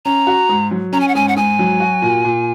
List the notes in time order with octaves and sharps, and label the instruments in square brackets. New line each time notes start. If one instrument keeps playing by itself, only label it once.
[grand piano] C#4 [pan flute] A#5
[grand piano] F#4
G#2
F#3
[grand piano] C#4 [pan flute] A#5
[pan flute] G#5
F#5
[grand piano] G#2 [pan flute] G#5
[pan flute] F#5
[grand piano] G#2 [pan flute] G#5
[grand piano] F#3
F#4
A#2
A#2